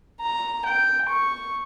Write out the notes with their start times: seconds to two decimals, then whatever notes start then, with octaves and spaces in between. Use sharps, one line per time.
0.21 A#5
0.65 G5
1.09 C#6